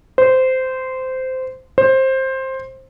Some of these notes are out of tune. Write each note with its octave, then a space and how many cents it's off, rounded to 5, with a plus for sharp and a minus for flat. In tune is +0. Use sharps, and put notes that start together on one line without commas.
C5 -15
C5 +15